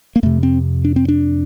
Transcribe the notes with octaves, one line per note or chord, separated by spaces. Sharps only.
A#3
F2 C3 A3
C4
D4
C4
D4